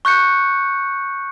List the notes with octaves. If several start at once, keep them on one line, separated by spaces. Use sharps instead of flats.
C#6 F#6 G6 C#7